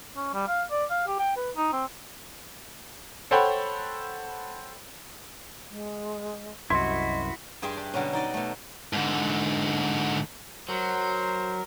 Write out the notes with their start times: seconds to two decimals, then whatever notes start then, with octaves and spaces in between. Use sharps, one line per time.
0.16 C#4
0.34 G3
0.48 F5
0.71 D5
0.91 F5
1.07 G4
1.19 G5
1.36 B4
1.56 D#4
1.73 C4
3.31 A4 C5 C#5 F#5 G5 B5
5.70 G#3
6.70 C2 F#2 E4 F#4 D#5 C6
7.62 G2 G4 G#4 E5 G5 C6
7.77 D4
7.93 B2 D3 F#3 G3 C#4
8.13 D#4 D5 D#5
8.34 B2 A3
8.93 G#2 D3
10.69 F#3 A#4 C5